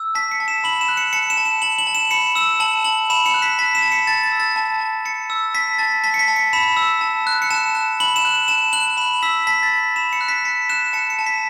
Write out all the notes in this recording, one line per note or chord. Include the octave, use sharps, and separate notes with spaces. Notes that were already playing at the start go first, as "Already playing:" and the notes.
Already playing: E6
A5 B6
C#7
A5
E7
B5 F#7
E7
F#6
C#7
A5 C#7
E7
A5
E7
A5 F#7
F#7
A5
E7
B5 C#7
E6 E7
A5 F#7
A5 F#7
B5 E7
C#7
F#6
B6
A5 B6
E7
A5
C#7
A5 A6
A6
E6
A6
A5
A5
A5 C#7
E6
A5 B6
A5 A6
A5 B6
C#7
B6
A5
C#7
B5 E7
E6
A5
F#6
C#7
A5 E7
F#6
B5 F#7
E7
F#6
A5 E7
F#6 F#7
B5 E7
E6 B6
A5 B6
A6
A5
B6
B5 E7
C#7
F#6
B6
A5 C#7
F#6 E7
A5 C#7
C#7
A5
B6